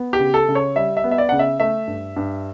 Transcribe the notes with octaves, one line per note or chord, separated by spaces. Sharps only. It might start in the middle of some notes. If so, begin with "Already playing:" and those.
Already playing: B3
G4
C#3
A4
C#3
C#5
G3 E5
E5
B3
E5
D5
C#3 F#5
E5
A3 E5
G2
G2